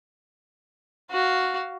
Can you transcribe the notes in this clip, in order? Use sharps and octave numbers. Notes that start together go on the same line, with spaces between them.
F#4 F5